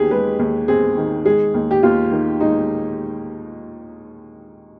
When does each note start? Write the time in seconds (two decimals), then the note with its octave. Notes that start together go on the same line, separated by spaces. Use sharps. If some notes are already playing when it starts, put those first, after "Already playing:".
Already playing: D#2 D#3 G4 G#4
0.11 G#3 B4
0.39 D#2
0.68 C4 G#4
0.97 D#3
1.25 G#3 G#4
1.54 D#2
1.71 G4
1.83 D#2 F4
2.12 D#3
2.40 G#3 D#4